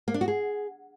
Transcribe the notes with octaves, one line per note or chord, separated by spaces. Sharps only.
A#3
D4
F#4
G#4